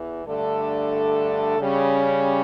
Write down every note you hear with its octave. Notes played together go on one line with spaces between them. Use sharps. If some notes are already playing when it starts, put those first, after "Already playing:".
Already playing: E2 E3
G2 D3 A3 D4 A4
C#3 G3 C#4